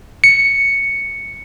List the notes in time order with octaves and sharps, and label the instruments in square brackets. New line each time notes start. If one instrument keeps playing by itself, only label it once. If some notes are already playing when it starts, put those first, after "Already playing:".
[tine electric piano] C#7